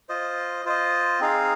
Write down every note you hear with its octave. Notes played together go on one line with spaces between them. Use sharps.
F4 C5 D#5
F4 C5 D#5
C4 D#4 G#4 F5